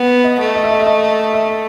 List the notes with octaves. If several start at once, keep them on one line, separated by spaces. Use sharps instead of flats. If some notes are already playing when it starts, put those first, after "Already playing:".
Already playing: B3
D#5
A3
D#5
E5
D#5
E5
D#5
E5